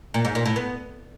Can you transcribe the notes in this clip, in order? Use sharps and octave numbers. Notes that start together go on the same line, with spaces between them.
A#2
G#2
A#2
A2
B3